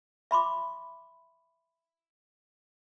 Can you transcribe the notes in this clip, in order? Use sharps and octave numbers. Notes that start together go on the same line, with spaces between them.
E5 B5 C6 D6